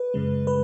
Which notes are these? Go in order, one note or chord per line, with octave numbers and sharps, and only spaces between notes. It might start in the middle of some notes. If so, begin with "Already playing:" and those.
Already playing: B4
F#2 C#3 G#3
G#3 B4